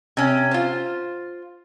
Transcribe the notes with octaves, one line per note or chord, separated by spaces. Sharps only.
C3 C#4
F4 C5